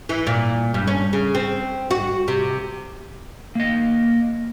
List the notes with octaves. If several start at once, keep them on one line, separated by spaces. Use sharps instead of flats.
E3
A#2
G2
C#4
C#3
C4
F#4
C3
A#3 D#5